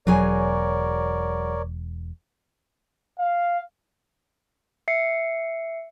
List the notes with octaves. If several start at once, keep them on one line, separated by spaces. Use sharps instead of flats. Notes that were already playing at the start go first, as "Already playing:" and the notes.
E1 F#3 G#4 A#4 C#5 D5 G#5
F5
E5 C7 C#7